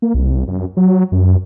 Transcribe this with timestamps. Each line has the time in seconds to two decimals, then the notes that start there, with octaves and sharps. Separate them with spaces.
0.02 A#3
0.14 C2
0.48 F#2
0.77 F#3
1.12 F#2